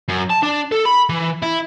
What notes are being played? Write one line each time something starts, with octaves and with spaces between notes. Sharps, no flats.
F#2
A5
D4
A4
B5
E3
E4